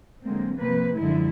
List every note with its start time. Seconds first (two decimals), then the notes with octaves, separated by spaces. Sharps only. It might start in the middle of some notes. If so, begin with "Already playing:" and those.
0.24 D3 F#3 G#3 A#3 C4
0.57 C3 F3 A#3 C4 B4
0.96 F#2 D3 F3 G#3 E4